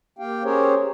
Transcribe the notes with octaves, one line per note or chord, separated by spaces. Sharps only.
A#3 G4 F5 G5
C#4 G4 G#4 A#4 C5 C#5